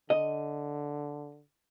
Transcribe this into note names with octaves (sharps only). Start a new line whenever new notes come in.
D3 D#5